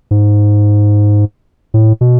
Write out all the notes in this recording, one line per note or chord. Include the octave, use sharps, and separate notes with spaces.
G#2
A2
B2